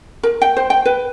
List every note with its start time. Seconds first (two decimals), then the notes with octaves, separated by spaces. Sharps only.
0.23 A#4
0.42 G5
0.57 C5
0.70 G5
0.85 B4